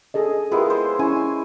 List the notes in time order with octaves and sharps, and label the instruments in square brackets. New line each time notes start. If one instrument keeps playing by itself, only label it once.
[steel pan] G#4 A4 D#5
[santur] G#3 B3 E4 [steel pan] F4 G4 A#4
[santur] C5
[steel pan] C#4 E4 [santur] G#5 C#6